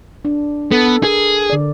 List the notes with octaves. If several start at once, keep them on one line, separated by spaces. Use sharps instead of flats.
D4
B3 A4
G#4 A#4
D3 D5